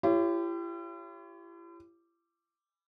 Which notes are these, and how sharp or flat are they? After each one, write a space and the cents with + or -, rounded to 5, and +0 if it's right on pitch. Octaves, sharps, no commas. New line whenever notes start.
E4 +45 G4 +0 C#5 +5